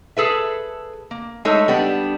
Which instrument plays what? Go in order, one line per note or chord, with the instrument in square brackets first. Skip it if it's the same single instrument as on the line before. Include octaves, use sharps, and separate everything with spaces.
[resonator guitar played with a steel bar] G#4 A4 B4 E5
A#3
G#3 A3 D#4 A4 C#5
G3 B3 D4